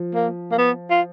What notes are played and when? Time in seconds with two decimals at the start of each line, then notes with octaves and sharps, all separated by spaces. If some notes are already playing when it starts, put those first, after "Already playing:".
Already playing: F3
0.15 A#3
0.51 A#3
0.58 B3
0.90 F4